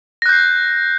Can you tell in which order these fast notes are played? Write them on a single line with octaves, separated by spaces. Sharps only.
A#6 F#6 G6 C7